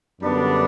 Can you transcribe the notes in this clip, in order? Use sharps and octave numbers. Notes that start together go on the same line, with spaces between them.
F#2 D3 G3 B3 D4